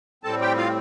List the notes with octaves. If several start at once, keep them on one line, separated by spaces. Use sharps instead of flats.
A2 G3 C4 A4 A5
G4 G5
F4 F5